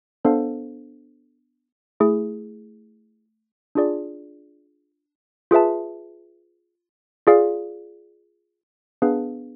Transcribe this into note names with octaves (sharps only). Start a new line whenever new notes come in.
B3 D4 A4 C5 F5
A3 E4 G#4
D4 F4 G#4 D5
F4 G#4 B4 E5 A5
F4 G#4 D5 F5
B3 D4 G#4 B4 F5